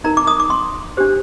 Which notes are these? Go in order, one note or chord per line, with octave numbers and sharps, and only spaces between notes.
D#4 A#4 A#5
D6
D#6
D6
C6
D4 G4 C5